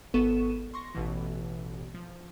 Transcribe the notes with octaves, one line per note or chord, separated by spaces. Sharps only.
G#1 B3 A4 C#6 D#7 E7
C6 C#6 A#6
A1 B2 E3
F3